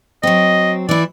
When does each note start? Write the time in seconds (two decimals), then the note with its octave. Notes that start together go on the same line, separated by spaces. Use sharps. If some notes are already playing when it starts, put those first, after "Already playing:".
0.23 F#3 C4 D#5
0.89 E3 E4 D5